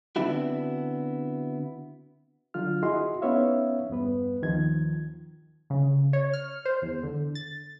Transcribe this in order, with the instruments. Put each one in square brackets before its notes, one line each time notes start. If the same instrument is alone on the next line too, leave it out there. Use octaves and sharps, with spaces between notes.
[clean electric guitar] D3 B3 C4 D4 E4 F#4
[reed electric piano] D3 F#3 F4 F6
E4 F#4 G#4 D#5 C6
B3 C#4 D#4 C#5 E5 F5
E2 G2 B3 B4
D#2 D#3 F3 G#6
[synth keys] C#3
C#5
F6
C5
E2
D3
A6